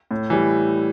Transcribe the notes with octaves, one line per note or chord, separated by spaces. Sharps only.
A2
E3 G3